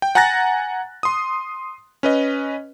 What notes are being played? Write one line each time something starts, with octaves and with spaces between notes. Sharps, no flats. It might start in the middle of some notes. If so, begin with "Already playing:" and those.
G5
F#5 G#5 A#5 F#6 A6 A#6
C6 D#6
C#4 B4 D#5